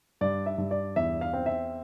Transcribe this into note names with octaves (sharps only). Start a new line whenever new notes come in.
G2 D5
E5
G2
D5
E2 E5
F5
C4
E5